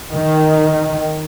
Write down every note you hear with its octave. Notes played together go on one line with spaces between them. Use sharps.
D#3